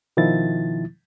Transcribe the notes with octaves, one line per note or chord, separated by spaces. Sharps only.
B2 D#3 F3 E4 A6